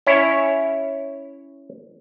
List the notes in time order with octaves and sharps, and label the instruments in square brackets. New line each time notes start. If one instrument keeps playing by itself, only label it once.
[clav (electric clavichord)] C#4 E4 C#5